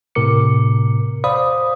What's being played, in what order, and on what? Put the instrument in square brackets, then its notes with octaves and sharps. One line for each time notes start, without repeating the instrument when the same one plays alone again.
[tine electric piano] A2 C3 A#4 D6 C#7
C5 D5 F5 B5 D#6